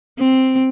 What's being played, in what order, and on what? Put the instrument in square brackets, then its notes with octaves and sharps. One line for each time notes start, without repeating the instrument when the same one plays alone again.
[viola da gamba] C4